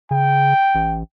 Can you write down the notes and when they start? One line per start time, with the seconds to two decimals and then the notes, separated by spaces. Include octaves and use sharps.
0.11 C#3 G5
0.75 A1